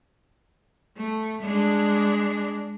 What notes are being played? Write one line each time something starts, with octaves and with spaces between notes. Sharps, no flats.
A3
G#3 D4